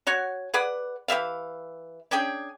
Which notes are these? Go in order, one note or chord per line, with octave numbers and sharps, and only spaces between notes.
F#4 C#5 F#5 G#5
G#4 B4 D5 F#5
E3 G4 E5 F5
C#4 D4 G#4 G5